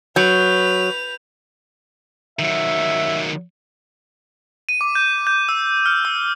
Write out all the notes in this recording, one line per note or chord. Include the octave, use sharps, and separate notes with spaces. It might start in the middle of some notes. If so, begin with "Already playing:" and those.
F#3 B4 G6 F7
D#3 F#3 E5
D#7
D6
G6
G6
E6
F6
E6